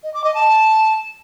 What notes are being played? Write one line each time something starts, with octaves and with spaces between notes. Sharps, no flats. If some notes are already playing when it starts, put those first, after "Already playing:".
D#5
D6
D#5
A5